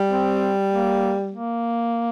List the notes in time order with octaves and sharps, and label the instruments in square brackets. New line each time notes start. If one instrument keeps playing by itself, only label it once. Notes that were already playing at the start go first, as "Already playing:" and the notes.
Already playing: [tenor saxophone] G3
[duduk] C4
A#3
A#3